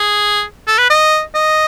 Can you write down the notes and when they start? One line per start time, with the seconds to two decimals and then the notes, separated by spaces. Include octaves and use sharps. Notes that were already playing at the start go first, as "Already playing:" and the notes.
Already playing: G#4
0.67 A4
0.78 B4
0.90 D#5
1.35 D#5